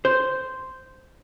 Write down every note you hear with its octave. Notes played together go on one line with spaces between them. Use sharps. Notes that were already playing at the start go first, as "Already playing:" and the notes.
C5